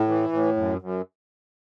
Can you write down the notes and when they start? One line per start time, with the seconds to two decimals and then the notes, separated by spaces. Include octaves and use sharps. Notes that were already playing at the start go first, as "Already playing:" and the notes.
Already playing: A2
0.08 E3
0.32 A2
0.57 F#2
0.81 F#2